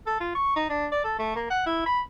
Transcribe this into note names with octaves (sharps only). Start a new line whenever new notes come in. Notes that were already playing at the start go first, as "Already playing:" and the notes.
A4
F4
C#6
D#4
D4
D5
A4
A3
A#3
F#5
E4
B5